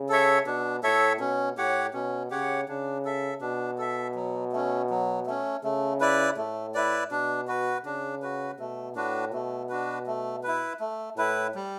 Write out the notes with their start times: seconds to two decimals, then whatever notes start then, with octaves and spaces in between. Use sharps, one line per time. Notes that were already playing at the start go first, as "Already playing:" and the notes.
Already playing: C#3
0.09 A4 C#5 E5
0.46 B2 D4
0.83 A2 A4 C#5 E5
1.20 B2 C#4
1.57 A2 G4 C#5 F#5
1.93 B2 C#4
2.31 C#3 G4 C#5 F#5
2.68 C#3 D4
3.05 A4 E5
3.41 B2 D4
3.78 A4 E5
4.15 F#3
4.52 A3 C#4
4.90 F#3
5.26 A3 C#4
5.63 C#3 A3
6.01 E4 B4 D5
6.37 A2 A3
6.74 E4 B4 D5
7.11 B2 D4
7.48 F#4 B4
7.85 C#3 D4
8.22 F#4 B4
8.59 B2 A3
8.95 A2 D4 F#4 B4
9.32 B2 A3
9.69 D4 F#4 B4
10.07 A3
10.43 E4 B4
10.80 A3
11.17 A2 E4 B4
11.55 G3